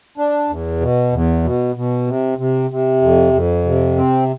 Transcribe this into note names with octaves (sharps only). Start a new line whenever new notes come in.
D4
E2
B2
E2
B2
B2
C3
C3
C3
F2
F2
C3
C4